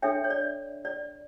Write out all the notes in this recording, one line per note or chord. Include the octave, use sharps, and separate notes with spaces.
D4 A4 C#5 E5 G5
C#5
D5
D5